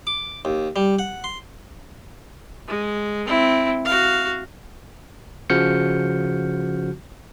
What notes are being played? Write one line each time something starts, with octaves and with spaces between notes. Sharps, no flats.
D6
D#2
G3
F#5
C6
G#3
C4 E4
F#4 F5
C#3 F3 F#4 F6 G6 C#7